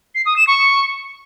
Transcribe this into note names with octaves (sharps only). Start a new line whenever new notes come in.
C7
D#6
E7
C#6